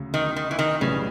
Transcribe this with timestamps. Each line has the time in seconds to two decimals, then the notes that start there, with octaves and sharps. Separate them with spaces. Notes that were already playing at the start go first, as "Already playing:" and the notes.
Already playing: D2 C#3 F#3
0.14 D#3
0.36 D#3
0.51 E3
0.59 D#3
0.81 B1 A2 C#3 E3 G3 B3